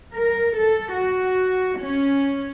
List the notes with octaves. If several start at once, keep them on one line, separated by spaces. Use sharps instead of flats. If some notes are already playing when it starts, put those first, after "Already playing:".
A#4
A4
F#4
C#4